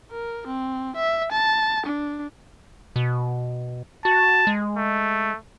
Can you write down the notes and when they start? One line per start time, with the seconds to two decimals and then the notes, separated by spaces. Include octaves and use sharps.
0.11 A#4
0.47 C4
0.96 E5
1.32 A5
1.86 D4
2.96 B2
4.05 F#4 A5
4.47 G#3
4.77 A3